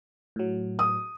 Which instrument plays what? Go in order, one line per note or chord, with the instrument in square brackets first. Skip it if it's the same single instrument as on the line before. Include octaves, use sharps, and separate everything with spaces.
[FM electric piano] A2 F#3
[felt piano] D#6